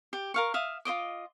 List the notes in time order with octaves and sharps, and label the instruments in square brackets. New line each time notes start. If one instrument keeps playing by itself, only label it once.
[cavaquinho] G4
A#4 F5 C#6
E5 F5 D#6
F4 C5 D#5 D6